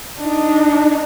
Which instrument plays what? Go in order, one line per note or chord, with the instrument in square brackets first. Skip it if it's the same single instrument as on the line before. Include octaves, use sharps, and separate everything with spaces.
[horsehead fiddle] D4 D#4